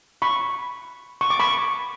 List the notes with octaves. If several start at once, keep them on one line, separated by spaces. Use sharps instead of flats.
B5 C#6
C#6
D6
B5 C#6